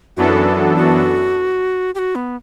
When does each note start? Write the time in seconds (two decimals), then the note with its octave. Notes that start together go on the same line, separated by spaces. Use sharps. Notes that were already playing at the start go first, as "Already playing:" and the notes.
0.17 F#2 E3 B3 D4 F#4 A4
0.77 F#4
1.95 G4
1.99 F#4
2.15 B3